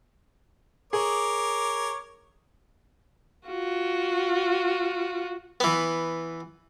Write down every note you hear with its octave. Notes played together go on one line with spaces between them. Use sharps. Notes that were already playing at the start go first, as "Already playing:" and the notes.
G#4 A#4 C#5 D6
F4 F#4
E3 B3